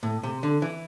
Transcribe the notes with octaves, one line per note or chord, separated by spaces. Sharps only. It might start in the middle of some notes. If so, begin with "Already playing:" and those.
A2
C3
D3
E3